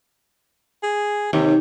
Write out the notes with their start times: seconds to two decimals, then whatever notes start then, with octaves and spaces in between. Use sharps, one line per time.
0.83 G#4
1.33 D#2 C3